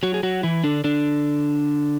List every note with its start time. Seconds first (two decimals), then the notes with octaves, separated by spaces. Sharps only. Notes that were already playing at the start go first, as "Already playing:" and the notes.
0.03 F#3 F#4
0.14 G#4
0.23 F#3 F#4
0.43 E3 E4
0.64 D3 D4
0.84 D3 D4